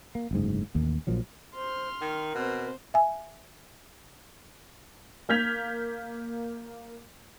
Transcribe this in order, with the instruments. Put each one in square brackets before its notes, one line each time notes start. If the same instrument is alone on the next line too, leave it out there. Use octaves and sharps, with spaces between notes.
[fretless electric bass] A#3
F#1 D2 G#2
A1 D#2 A#3
A#1 A#2 F3 F#3
[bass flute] C5 [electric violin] C6 F6
[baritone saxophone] D#3 [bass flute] A#4
[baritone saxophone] B2 [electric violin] C4 C5
[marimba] E5 G#5
[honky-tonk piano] A#3 F6 G6 G#6 B6 F7